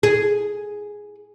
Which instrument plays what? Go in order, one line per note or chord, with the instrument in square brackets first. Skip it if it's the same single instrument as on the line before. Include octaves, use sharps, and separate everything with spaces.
[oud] G#4